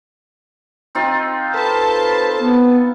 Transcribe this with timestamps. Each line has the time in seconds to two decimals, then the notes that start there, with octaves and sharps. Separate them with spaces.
0.95 C4 D#4 F4
1.54 A4 B4 C5 A5 B5
2.40 B3 A5